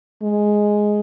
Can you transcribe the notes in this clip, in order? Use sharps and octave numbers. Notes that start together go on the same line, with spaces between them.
G#3